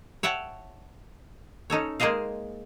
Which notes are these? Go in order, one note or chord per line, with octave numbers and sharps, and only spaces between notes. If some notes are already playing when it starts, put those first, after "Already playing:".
C#5 E5 F#5 G5 A5
C#4 D#4 A4 C#5
G#3 A#3 G#4 C5 D#5 F5